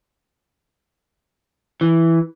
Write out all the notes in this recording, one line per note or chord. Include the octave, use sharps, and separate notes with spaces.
E3